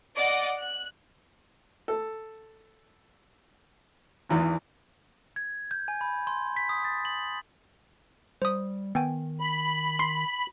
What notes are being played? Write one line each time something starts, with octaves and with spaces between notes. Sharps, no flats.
D5 D#5 F#5 D6
F#6
A4
G#1 E2 E3
G#6
G6
G#5
B5
C6
B6
D#6
A6
F#7
G3 C5 D#6
D#3 B3 G5 G#5
B5
C6 C7